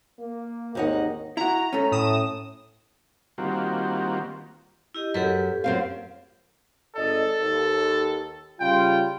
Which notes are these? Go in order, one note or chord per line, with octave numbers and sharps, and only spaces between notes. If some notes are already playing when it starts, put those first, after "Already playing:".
A#3
G#1 D#2 D#4 F#5
E4 F#4 A#5
A3 C#4
A2 D#6 E7
D#3 G3 A#3 C4 F4 F#4
E4 G4 D#5
F#2 G4 A4 B4
F#2 C4 F5
G#1 A4 D5 D#5
D#2
C#3 G3 F4 G5